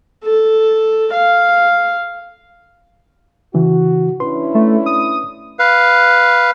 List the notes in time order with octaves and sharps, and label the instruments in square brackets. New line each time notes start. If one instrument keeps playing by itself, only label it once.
[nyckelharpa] A4
F5
[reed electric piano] C#3 E3 [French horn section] F#4
[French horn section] C#4 D4 E4 [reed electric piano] B4 C6
[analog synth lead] A3
D#6
[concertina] B4 F5